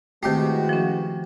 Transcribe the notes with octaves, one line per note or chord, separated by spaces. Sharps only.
C3 D#3 E3 G#3 A3 F#4 G4
F3 C#4